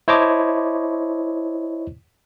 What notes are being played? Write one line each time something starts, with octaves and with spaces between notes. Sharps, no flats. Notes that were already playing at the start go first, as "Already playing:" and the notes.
E4 C5 C#5 D#5 A5 D6